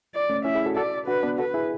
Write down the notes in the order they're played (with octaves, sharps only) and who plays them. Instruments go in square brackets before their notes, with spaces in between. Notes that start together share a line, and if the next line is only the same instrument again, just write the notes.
[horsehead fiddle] D5
[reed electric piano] A3 C#4
[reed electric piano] C#4 E4 [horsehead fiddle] E5
[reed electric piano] E4 G#4
F#4 A4
[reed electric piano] F#4 A4 [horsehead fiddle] D5
[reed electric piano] D4 F#4 [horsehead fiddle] B4
[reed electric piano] B3 D4
[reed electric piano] F#4 A4 [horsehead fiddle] B4
[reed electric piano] E4 G#4